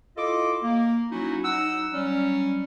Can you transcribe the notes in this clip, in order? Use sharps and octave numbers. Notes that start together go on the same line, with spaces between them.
E4 F4 A4 D#5 D6
A#3
F#3 C#4 D#4 E4 F#4
F#3 D#4 F#5 E6
F#3 G3 C#4